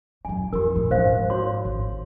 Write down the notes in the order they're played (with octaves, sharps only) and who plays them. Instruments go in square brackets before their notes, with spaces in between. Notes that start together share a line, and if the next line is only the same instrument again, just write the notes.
[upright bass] F#2 F#3 [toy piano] G#5
[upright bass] F2 F3 [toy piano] G4 A#4
[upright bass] A#2 E3
[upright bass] G#2 F3 [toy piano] D4 C5 F5
[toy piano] F#4 C#5 C6
[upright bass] G#1